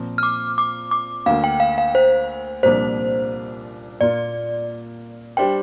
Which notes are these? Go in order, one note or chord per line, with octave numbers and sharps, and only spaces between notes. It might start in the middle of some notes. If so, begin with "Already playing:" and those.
Already playing: A#2 F3 C4
F6
D6
D6
D6
D2 D3 A#3 F5
G5
F5
F5
C5
C2 A#2 F3 A#3 D4 C5
A#2 A#3 F4 D5
G3 D4 G4 C5 G5